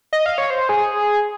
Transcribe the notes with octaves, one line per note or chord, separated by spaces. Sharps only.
D#5
F5
C#5
C5
G#4